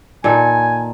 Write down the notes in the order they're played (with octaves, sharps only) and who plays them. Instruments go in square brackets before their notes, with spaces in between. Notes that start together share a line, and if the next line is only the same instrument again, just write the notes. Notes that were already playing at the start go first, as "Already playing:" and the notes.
[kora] A#2 D#3 A4 [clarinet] G#5